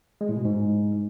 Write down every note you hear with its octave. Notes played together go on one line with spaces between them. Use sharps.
G#3
A2
B2
G#2